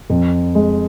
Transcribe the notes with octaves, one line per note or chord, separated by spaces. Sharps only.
F2
G#3